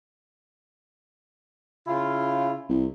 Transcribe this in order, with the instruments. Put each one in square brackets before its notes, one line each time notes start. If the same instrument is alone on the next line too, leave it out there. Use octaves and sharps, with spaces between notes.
[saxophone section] C#3 E4 F4
[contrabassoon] C2